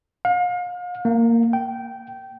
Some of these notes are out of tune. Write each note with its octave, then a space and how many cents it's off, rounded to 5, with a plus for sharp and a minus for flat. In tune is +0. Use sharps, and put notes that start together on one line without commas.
F5 +40
A#3 -15
G5 -15